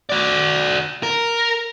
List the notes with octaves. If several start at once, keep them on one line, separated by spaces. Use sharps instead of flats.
F#4 D5
A#4